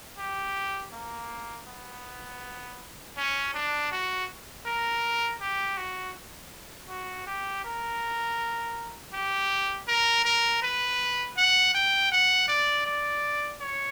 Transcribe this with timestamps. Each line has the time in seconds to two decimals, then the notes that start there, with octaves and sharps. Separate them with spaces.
0.19 G4
0.93 A#3
1.67 B3
3.17 C#4
3.54 D4
3.91 F#4
4.66 A#4
5.41 G4
5.77 F#4
6.89 F#4
7.27 G4
7.64 A#4
9.13 G4
9.88 A#4
10.25 A#4
10.62 B4
11.37 F#5
11.74 G5
12.12 F#5
12.48 D5
12.86 D5
13.61 C#5